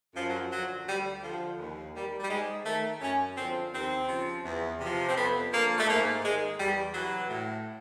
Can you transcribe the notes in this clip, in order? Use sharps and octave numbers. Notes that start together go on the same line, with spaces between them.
F#2 F3
F#3
F3
D3 F3 F#3
D2 G3
D3 F3
D#2
D#3 G3
G3
G#2 G#3
D#3 A3
F#2 C#4
D3 F3 C4
D#2 C4
C#3 F3
E2
C3 F3
C4
F2 B3
D3 F3 A#3
A3
G#2 A#3
D#3 G#3
E2 G3
C3 E3 F#3
A2